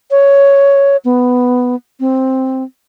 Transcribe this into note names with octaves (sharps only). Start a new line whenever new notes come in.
C#5
B3
C4